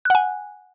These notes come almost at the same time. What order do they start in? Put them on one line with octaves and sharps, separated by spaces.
F#6 F#5 G#5